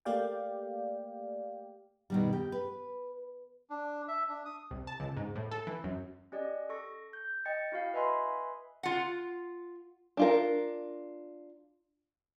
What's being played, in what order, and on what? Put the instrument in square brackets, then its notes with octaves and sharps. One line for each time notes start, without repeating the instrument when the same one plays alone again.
[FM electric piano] A3 A#3 G4 D5 F5 G5
[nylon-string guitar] B2 D#3 G3
G4
B4
[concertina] D4
E5
D4
D#6
[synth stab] C2
A5
C#2
G#2
A2
A4
E3
F#2
[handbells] C#4 G4 D5 D#5
A4 C#6 A#6
G6
D#5 G5 A6 C#7
E4 F#4 F5
B4 D#5 E5 G#5 B5 C6
[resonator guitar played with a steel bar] F4 F#5
[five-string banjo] D4 F4 A#4